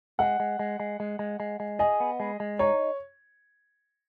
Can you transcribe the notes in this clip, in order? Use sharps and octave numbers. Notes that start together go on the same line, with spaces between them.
G#3 F#5
G#3
G#3
G#3
G#3
G#3
G#3
G#3
G#4 D#5
B3
G#3
G#3
D#4 C#5